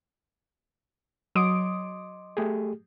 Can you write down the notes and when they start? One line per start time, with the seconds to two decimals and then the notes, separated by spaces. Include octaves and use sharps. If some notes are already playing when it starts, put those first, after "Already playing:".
1.35 F#3 D#5 C6 D6 D#6 D7
2.37 A3 G4 G#4